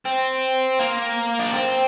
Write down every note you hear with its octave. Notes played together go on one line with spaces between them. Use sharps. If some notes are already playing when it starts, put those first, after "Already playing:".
C4
A#3
D4
C4